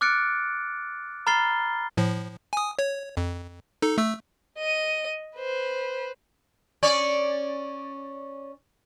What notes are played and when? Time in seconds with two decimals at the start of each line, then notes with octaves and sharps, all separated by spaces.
0.01 D6 F6 F#6 A6 C#7 D7
1.27 A#5 B5 F6 A6 C7 G7
1.97 A2 F3
2.53 G#5 D#6
2.79 C#5
3.17 F2
3.82 D#4 A4
3.98 A3 E6
4.58 D#5 D#7
5.37 B4 C5
6.83 C#4 C#5 D5